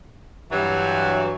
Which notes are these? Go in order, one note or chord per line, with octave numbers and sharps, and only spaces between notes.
G2 E3 F#3